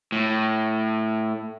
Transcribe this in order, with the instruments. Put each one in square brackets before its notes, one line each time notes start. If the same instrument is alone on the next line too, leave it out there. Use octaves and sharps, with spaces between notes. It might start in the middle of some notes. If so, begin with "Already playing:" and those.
[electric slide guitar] A2